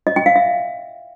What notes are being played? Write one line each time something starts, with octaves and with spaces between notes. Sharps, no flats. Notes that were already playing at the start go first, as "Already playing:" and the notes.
D#5
G5
F5
E5